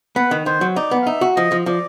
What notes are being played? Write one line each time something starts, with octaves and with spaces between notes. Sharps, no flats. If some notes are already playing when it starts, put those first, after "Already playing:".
B3 B4
D#3
D#3 C5
F#3
D#4 D5
B3
F5
D#4 E5
F#4
F3 D#5
F3
F3 D5